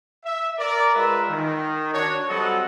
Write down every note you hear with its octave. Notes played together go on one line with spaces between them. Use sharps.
E5
A#4 D5
G#3 F4 A#4 B4 E5
D#3
D4 F#4 C#5
F#3 G3 C4 A4 D#5 F#5